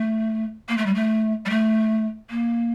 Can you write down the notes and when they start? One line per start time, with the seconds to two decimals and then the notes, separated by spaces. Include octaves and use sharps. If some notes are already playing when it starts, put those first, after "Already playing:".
Already playing: A3
0.69 A#3
0.77 A3
0.86 G3
0.94 A3
1.46 G3
1.50 A3
2.30 A#3